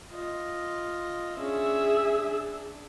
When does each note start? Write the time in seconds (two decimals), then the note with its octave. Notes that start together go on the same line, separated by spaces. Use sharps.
0.11 F4 D#5
1.39 C#4 D4 G#4 E5
2.15 D4